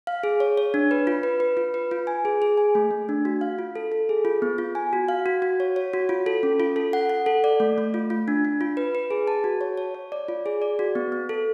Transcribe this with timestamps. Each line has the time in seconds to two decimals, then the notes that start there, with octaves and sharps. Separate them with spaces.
0.07 F5
0.23 G#4
0.40 C#5
0.57 C#5
0.74 D4
0.91 B4
1.07 F4
1.23 B4
1.40 B4
1.57 F4
1.74 B4
1.91 F4
2.07 G#5
2.25 G#4
2.42 G#4
2.57 G#5
2.75 A3
2.91 A3
3.09 D4
3.25 F#4
3.41 F5
3.59 F4
3.75 A4
3.92 A4
4.09 G#4
4.25 F4
4.42 B3
4.58 F4
4.75 G#5
4.93 F#4
5.09 F5
5.26 F#4
5.42 F#4
5.60 C#5
5.76 C#5
5.93 F#4
6.09 F4
6.26 A4
6.43 C#4
6.60 F4
6.76 A4
6.93 F#5
7.10 F#5
7.26 A4
7.44 D5
7.60 A3
7.78 A3
7.94 F4
8.10 F4
8.28 D4
8.45 D4
8.61 F4
8.77 B4
8.95 B4
9.11 G#4
9.27 A5
9.44 F#4
9.61 C#5
9.77 C#5
9.95 C#5
10.12 D5
10.28 F4
10.46 G#4
10.62 D5
10.79 F#4
10.95 B3
11.12 B3
11.29 A4